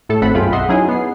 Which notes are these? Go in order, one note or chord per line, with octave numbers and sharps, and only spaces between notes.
A2 A4 A5
G#1 A3 C4 A4 F#5 B5
B1 F#2 F4 G#4 G5 B5
D#5 E5 F#5 C6
F#3 C#4 D#4 E4 G#4
B3 C7